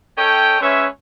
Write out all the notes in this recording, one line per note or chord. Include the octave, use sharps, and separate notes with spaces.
C#4 A4 C#5 D#5 G5
G#3 C#4 B4 C#5 E5